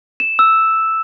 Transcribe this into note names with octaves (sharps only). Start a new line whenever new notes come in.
E7
E6